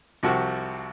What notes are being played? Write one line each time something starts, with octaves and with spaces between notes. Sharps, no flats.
C2 C3 F3 F#4 C#6